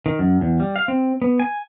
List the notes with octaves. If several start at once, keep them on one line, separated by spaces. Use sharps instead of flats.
D#3
F#2
E2
G3
F5
C4
B3
G#5